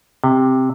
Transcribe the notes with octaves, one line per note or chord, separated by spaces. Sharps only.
C3